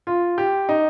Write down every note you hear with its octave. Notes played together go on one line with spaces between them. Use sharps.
F4
G4
D#4